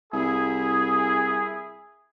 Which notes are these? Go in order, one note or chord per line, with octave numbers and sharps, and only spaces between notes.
C2 E4 G#4